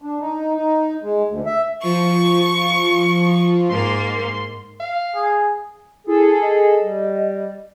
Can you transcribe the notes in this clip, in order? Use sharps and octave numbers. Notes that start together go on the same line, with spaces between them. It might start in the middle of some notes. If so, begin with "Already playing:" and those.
D4
D#4
D#4
G#3
D2
E5
F3 C#6
G#2 A#3 C6
F5
G#4
E4 G#4 A4
D#5
G3